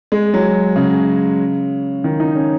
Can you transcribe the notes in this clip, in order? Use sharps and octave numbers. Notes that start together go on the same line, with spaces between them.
G#3
F#3
C#3
D#3
D#4
C#4